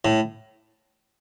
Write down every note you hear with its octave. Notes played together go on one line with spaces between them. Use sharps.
A2